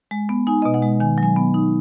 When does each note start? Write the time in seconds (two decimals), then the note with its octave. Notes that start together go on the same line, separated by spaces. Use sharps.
0.11 G#3
0.29 B3
0.47 D#4 G#5
0.62 B2 D#5
0.74 F#5
0.83 G#3
1.00 D#3 G#5
1.18 F#3 G#5
1.36 B3
1.54 D#4